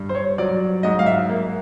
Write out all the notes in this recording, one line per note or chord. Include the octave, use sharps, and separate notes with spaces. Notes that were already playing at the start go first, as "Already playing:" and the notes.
Already playing: G2
C5
C#5
F#3 D5
G#2 D#5
F5
E5
A#3